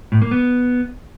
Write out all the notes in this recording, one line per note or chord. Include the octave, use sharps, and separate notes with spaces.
A2
A#3
B3